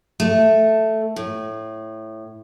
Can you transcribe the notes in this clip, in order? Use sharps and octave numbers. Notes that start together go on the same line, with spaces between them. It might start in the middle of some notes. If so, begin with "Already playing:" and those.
A3
A2